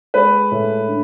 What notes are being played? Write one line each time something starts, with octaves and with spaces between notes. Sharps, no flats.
G#3 B4
A2
D3